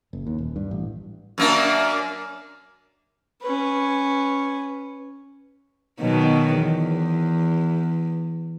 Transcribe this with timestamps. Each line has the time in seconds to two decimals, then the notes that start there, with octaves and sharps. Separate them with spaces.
0.13 F#1
0.27 D#2
0.38 D#1
0.56 G2
0.71 A1
1.38 F#2 A#3 D4
3.42 C#4 B4
6.00 B2 D#3 F#3
6.57 E2